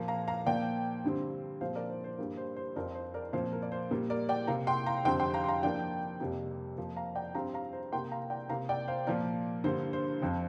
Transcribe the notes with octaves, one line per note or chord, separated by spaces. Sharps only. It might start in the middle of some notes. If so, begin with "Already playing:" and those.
Already playing: A#2 F3 A#3
F5 A#5
F5 A#5
A#2 F3 A#3 D5 G5
G2 D3 G3 C4
A#2 F3 C4 C5 F5
A#4 D5
C5
C5
G2 G3 A#3
C5
C5
F2 F3 C4 A#4 D5
C5
A#4 D5
A#2 F3 C4 C5 F5
A#4
D5
C5
A#2 G3 A#3
A#4 D5
D5 G5
C3 A#3 F5 A#5
G5 C6
F5 A#5
F2 D3 G3 C4 G5 C6
G5 C6
F5 A#5
C6
F5 A#5
G2 F3 A#3 D5 G5
F2 C3 G3 A#3
F2 F3 A#3
F5 A#5
D5 G5
G2 G3 C4 F5 A#5
F5 A#5
C5
C3 A#3 G5 C6
F5 A#5
D5 G5
C3 A#3 F5 A#5
D5 G5
C5 F5
A#2 F3 A#3 A#4 D5
G2 D3 G3 A#3 C5
C5
F2 F3 C4